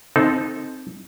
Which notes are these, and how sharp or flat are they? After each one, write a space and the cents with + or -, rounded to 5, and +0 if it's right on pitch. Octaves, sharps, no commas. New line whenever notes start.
C4 +0 D#4 +0 A4 -20